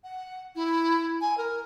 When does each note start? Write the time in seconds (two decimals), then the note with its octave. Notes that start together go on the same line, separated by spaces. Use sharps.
0.04 F#5
0.56 E4
1.21 G#5
1.38 A#4